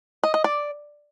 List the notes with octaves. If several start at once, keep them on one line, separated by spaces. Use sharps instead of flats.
D#5
D#5
D5